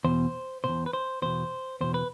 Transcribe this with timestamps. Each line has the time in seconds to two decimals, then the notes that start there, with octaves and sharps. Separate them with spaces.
0.04 E2 B2 C5
0.64 B2 C5
0.68 E2
0.86 B4
0.93 C5
1.22 E2 B2 C5
1.81 E2 B2 C5
1.94 B4